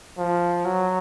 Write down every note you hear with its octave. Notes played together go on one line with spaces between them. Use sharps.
F3
F#3